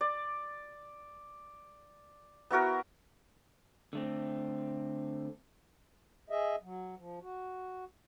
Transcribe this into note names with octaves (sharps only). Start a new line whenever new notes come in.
D5
B3 E4 F#4 A#4
D3 A3 C4
G#4 D#5 E5
F#3
F3
F#4